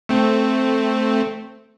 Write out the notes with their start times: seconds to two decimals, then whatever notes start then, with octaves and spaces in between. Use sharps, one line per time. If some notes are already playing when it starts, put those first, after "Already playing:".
0.09 A3 C4